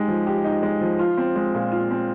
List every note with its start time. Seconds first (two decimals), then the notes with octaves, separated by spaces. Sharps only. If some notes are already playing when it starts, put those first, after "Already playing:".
Already playing: G#3 D#4 G4
0.08 F3
0.27 G4
0.44 D#4
0.63 G#3
0.81 F3
0.99 F4
1.17 C4
1.36 G#3
1.55 A#2
1.72 F4
1.91 C4